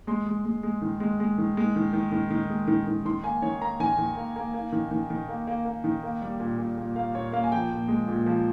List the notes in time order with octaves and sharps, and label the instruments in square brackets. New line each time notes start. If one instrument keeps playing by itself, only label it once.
[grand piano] G#3 C6
G#3
G#3
G#3
D#3
G#3
G#3
D#3
G#3
D#3
D#3
D#3
D#3
G#3
D#3
D#3
D#3 C6
A#3 G#5
D#3 C#5
A#3 A#5
D#3 G#5
D#3
A#3
A#3
A#3
D#3
D#3
D#3
A#3
A#3
A#3
D#3
A#3
G3
A#2
A#2
A#2
A#3 F5
A#2 C#5
A#3 F5
G#5
F3 G5
A#2
G#3
A#2
F3